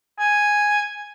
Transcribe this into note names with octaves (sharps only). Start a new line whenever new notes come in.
G#5